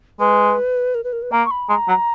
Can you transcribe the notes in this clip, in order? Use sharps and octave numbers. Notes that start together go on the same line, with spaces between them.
G#3 B4
A#4
B4
A#4
B4
A#3 A#5
C#6
B5
G#3 A#5
F#3